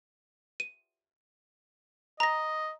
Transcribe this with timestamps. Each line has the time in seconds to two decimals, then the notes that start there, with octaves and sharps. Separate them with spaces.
0.60 D#7
2.20 D#5 A#5 A#6